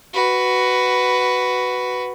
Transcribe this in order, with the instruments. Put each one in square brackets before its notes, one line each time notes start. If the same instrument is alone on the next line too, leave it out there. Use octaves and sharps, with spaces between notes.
[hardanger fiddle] F#4 B4